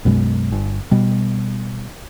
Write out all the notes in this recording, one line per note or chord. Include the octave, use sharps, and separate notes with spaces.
B1 F#2 B2 G#3
G1
B2 G3